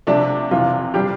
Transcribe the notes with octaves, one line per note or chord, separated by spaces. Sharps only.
C3 F3 A3 D4
F2 C3 E3 F4
D3 G3 D4 F4 G4